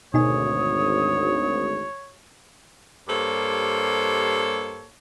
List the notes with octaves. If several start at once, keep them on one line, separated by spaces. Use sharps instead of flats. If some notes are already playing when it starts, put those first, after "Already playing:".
G#1 D2 B2 D#4 C#5 G#5 D#6
G2 A#3 G4 A4 C5 C#5